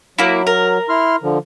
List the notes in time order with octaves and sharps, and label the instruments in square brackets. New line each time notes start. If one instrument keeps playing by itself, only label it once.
[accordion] F#3 [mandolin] A#3 E4
[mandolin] A#4
[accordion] E4 C6 F6
D3 F3